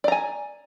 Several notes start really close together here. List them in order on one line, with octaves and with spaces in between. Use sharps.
D5 A#5 G#5